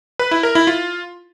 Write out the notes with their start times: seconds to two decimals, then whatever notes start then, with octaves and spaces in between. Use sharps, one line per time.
0.19 B4
0.31 E4
0.43 A#4
0.55 E4
0.67 F4